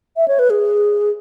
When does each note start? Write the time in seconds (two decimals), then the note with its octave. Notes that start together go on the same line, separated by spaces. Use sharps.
0.17 E5
0.28 C#5
0.39 B4
0.50 G#4